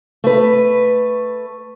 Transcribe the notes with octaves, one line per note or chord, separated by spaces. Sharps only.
A3 B4